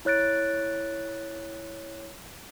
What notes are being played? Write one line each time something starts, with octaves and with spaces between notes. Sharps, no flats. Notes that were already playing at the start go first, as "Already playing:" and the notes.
E4 C#5 F#6 A6 D7